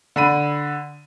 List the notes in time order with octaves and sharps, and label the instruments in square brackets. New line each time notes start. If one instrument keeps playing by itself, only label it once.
[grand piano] D3 B5 D#7